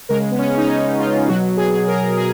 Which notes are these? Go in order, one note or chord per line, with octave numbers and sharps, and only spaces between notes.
C#3 G#3 A#4
B3
C#4
D#4
C#4
F4
B2 F#3 F#4
G#4
A#4
G#4